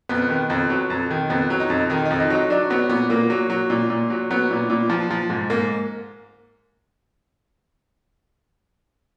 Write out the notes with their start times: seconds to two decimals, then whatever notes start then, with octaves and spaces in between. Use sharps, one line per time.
0.09 F2 B3
0.30 D#3
0.50 F2
0.70 F#3
0.90 F2
1.11 D#3
1.30 F2 B3
1.50 F#3
1.60 D#4
1.70 F2
1.90 D#3 D#4
2.05 D#4
2.10 F2
2.20 D#4
2.30 F#3 D#4
2.50 F#3 D4
2.70 F#3 B3
2.89 A#2 B3
3.10 A#2 A#3
3.30 F#3
3.50 F#3
3.70 A#2
3.90 A#2
4.10 F#3
4.30 F#3 B3
4.51 A#2
4.70 A#2
4.90 F3
5.10 F3
5.30 G#2
5.50 G#2 A#3